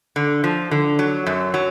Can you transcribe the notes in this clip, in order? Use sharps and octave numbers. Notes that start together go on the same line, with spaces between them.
D3
F3
D3
F#3
F#2
F#3